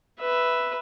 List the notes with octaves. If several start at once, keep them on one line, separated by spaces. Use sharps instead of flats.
B4 E5